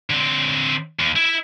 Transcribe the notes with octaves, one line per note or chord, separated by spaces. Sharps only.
D3 C4
D#2
E4 E5